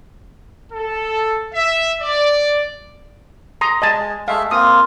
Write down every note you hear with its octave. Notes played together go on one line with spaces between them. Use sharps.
A4
E5
D5
A#5 C6 D#6
G#3 D#5 G#5 A5
G#3 A3 E5 F5
A#3 C4 F4 D#6